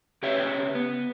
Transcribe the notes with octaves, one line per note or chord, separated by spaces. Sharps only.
C#3 G4 B4 C#5 E5
B3